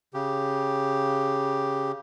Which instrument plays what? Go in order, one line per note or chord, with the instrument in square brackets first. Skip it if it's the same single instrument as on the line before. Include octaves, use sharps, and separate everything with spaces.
[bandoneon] C#3 G4